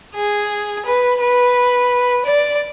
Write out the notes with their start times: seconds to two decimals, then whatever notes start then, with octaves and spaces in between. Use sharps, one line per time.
0.15 G#4
0.85 B4
1.20 B4
2.25 D5